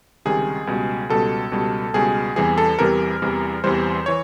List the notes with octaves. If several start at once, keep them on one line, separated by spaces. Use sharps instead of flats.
C#2 C3 D#3 G3 G#4
C#2 B2 G3
C#2 B2 G3 A4
C#2 B2 G3
C#2 B2 G3 G#4
E2 C3 E3 G3 G#4
A4
E2 C3 E3 G3 A#4
E2 C3 E3 G3
E2 C3 E3 G3 C5
E3 C#5